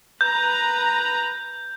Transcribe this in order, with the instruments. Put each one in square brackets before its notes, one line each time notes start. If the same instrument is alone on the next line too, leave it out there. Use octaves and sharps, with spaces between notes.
[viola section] B4 A#5 [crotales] G6